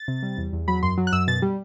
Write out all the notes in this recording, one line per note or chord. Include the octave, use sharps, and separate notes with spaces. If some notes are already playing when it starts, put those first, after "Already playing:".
Already playing: A6
C3
G3
E2
E2
F#3 B5
F#2 C6
F#3
F#6
F#2 E6
B2 A6
G3